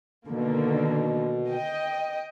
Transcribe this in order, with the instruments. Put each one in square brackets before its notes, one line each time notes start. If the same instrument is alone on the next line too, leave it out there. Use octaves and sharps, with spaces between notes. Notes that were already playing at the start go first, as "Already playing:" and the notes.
[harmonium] B2 [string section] D3 D#3 A#3
[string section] D#5 G5